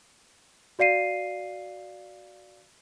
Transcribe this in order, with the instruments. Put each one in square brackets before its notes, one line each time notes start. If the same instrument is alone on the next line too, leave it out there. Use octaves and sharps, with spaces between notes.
[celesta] F#4 D5 F5 C7 D#7